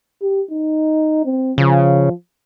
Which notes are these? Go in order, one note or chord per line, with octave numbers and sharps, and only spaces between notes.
G4
D#4
C4
C#3 F3